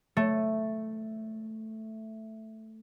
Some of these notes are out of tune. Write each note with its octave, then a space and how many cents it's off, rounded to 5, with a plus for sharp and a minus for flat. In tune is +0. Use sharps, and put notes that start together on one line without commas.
A3 +0